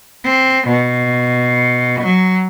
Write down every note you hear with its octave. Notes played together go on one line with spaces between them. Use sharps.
C4
B2
F#3